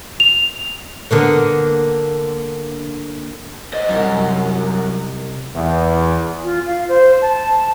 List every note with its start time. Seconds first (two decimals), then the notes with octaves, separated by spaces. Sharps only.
0.20 F7
1.11 D3 A#3 B3
3.73 C5 D#5
3.89 C2 F#2 D#4
5.55 E2
6.44 F4
6.67 F5
6.89 C5
7.22 A5